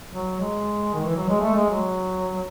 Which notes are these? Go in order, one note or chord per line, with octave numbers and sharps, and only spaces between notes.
F#3
G#3
D#3
E3
F#3
G#3
A3
G#3
F#3